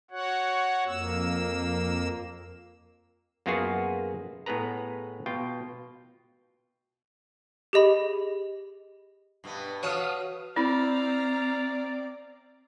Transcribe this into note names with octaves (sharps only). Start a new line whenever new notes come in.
F#4 C#5 F#5
F2 A#3 E6
F#2 A#3 B3 F4 F#4 G#4
A2 B3 G#4 B4 A#5
B2 F4 G5
G4 G#4 D#5 B5
G2 B2 B3
B3 F#4 C#5 F5 F#5 A5 D#6
C4 E4 D5 F5 A#5 B5